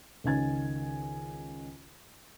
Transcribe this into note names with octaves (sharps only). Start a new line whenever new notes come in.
C#2 D#3 C#4 G#5 G#6 A6